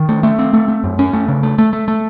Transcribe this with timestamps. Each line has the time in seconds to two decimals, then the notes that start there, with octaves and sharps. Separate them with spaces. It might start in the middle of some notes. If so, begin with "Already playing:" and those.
Already playing: D#3
0.09 A3
0.23 A3
0.39 C4
0.53 A3
0.68 A3
0.84 F#2
0.99 C#4
1.13 A3
1.28 C#3
1.43 A3
1.58 A3
1.73 A3
1.88 A3